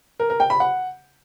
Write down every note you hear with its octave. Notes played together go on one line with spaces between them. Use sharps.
A#4
A#4
G5
B5
F#5